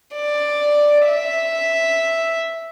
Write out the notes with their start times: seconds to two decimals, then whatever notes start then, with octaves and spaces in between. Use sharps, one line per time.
0.16 D5
1.08 E5